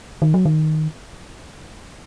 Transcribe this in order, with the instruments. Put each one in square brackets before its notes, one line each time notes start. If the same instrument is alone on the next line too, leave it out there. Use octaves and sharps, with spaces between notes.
[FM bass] D#3
F#3
D#3